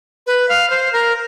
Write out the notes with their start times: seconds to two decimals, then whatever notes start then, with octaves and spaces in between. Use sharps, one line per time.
0.27 B4
0.49 F5
0.70 C5
0.93 A#4